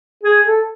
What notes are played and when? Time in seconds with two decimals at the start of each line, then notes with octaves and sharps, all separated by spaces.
0.24 G#4
0.46 A4